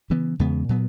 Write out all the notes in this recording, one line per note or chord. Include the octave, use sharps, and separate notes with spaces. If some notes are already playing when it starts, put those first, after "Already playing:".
C#3 E3 B3
E2 C#3 G#3 B3
A#2 F#3 B3